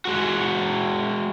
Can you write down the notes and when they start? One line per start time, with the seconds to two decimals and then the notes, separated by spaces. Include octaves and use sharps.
0.05 G#3 F#4